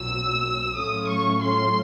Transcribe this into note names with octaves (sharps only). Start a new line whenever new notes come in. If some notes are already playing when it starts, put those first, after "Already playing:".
Already playing: B1 A#2 F#3 E6
A2 F#3 A3 C#4 F4 D#6
C#6
C6